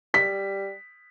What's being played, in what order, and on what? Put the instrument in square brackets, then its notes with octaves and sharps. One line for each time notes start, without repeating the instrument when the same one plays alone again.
[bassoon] G3 [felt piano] B6